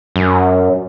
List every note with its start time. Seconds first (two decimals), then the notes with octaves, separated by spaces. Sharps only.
0.16 F#2